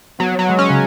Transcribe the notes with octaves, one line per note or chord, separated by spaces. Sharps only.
F#3 B3
F#3
G#3
C#4
C#3